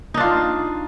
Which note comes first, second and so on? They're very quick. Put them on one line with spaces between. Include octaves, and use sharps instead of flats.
D#4 D4 F4